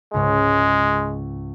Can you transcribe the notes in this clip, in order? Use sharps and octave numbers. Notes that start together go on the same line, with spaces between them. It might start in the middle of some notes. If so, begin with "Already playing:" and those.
C#2 G#2 G#3 C#5